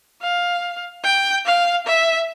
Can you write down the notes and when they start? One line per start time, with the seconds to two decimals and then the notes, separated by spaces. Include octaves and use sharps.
0.21 F5
1.04 G5
1.46 F5
1.86 E5